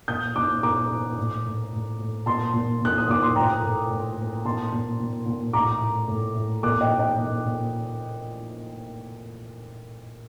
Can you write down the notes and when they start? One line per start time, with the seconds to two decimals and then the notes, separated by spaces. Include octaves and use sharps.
0.08 A#2 D#6 G6
0.36 A#2 D6 F#6
0.63 A#2 A#5 D6
0.91 A#2
1.18 A2
1.45 A2
1.72 A2
1.99 A2
2.26 A#2 A5 C6
2.54 A#2
2.81 A#2 F#6
2.98 D#6
3.08 A#2 D6
3.23 C6
3.35 A2 G5 A#5
3.63 A2
3.90 A2
4.17 A2
4.45 A#2 A5 C6
4.72 A#2
5.00 A#2
5.26 A#2
5.53 A2 A#5 D6
5.81 A2
6.08 A2
6.35 A2
6.63 A#2 D6 F#6
6.81 D#5 G5
6.90 A#2
6.99 D#5 G5
7.17 A#2
7.45 A#2